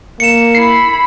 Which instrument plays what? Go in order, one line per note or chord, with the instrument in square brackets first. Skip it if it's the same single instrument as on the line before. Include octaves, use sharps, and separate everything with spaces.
[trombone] A#3 [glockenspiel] C#7 E7
[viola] E4 B5 [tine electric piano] C7